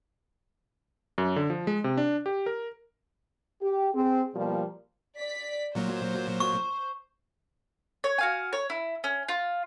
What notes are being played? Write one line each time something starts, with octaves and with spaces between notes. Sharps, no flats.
F#2
D3
F3
G#3
C3
D4
G4
A#4
G4
C4 G#4
B2 F3 G3 A#3
D5 B6
A#2 F#3 A#3 C5
C#6
C#5
F#4 F5 G#5
C#5
E4
C#4
F4